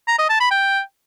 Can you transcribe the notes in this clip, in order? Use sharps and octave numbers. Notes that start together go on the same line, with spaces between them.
A#5
D#5
A5
B5
G5